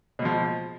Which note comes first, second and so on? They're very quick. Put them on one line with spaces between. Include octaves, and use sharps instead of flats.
B2 G#3 F3